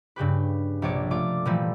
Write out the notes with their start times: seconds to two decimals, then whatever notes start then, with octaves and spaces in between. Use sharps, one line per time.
0.16 G2 C#3 G4 B4
0.82 A#1 C3 C#5 D5 D7
1.11 A3 F4 D5 D6
1.45 A#2 E3 F3 G3 A3